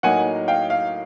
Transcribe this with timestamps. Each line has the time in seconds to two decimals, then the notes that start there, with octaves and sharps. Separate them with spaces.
0.03 A2 F#3 A#3 D#4 F#5 G#5
0.48 F5 G5
0.70 F5